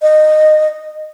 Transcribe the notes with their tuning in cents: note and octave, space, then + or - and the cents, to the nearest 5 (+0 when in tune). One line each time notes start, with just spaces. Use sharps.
D#5 -20